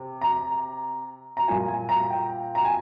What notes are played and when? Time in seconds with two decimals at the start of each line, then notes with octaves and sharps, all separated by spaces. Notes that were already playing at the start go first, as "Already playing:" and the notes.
Already playing: C3
0.21 A#5
1.37 A#5
1.48 A#2 G3 A#3 F4 G#5
1.68 G#5
1.89 A#5
2.10 G5
2.55 A#5
2.65 G#5